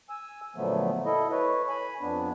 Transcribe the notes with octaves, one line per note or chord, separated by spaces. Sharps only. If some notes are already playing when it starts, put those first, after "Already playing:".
G#5 E6
A#2 D3 F3 F#3 A3 B3
E4 A4 D#5
B4 C#5
G#5 B5
F2 B3 D4